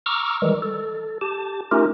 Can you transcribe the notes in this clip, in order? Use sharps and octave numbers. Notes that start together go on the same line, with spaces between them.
A#5 C#6 D6 E6 F6
D#3 E3 G3 G#3
A4
G4 A5
A3 C#4 D#4 F4 G4 A#4